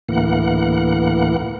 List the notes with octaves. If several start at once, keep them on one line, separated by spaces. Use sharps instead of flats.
D2 A2 E3 A#3 F#5